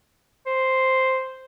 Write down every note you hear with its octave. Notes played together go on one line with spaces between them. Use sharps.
C5